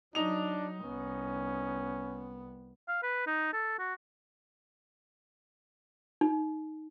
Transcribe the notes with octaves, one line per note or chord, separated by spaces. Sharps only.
F#3 D4 D#4 F7
C2 B3 C#4
F5
B4
D#4
A4
F#4
D#4